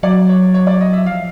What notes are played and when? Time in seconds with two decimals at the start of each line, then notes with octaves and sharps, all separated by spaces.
0.03 F#3 D5
0.29 C#5
0.54 C#5
0.67 D5
0.81 D#5
0.93 E5
1.06 F3 F5